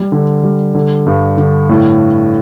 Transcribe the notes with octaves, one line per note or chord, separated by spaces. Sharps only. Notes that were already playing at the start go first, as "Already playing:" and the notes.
Already playing: G3
D3
G3
D3
G2
D3
A2